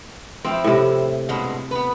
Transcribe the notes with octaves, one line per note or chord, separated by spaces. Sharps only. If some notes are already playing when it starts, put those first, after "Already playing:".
F3 C4 E4
A2 C3
G2 B2 G#3
B3 B4